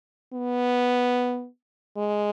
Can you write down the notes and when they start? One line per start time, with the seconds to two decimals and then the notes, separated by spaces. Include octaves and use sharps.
0.33 B3
1.96 G#3